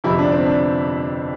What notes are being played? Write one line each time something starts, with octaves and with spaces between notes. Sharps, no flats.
G1 F2 C3 F3 E4
D4
C4
D4